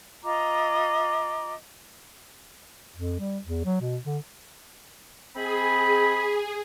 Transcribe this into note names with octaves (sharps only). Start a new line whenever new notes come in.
F4 D#5 A#5 D6
F2
G3
E2
F#3
B2
D3
C4 G#4 D#5 B5